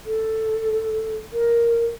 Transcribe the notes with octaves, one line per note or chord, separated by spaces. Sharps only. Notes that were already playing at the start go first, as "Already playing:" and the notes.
A4
A#4